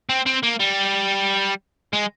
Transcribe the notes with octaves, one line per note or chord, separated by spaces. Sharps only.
C4
C4
A#3
G3
G#3